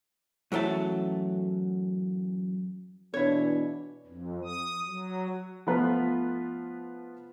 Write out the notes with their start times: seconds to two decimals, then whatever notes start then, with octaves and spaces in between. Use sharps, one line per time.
0.52 F#2 E3 F#3 A3 A5
3.14 B2 E3 D4 E4 C#5
4.07 F2
4.45 D#6
4.86 F#3
5.67 F3 A3 B3 F4 B4